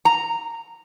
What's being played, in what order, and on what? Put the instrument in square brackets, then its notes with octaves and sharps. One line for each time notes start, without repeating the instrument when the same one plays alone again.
[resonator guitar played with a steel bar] A#5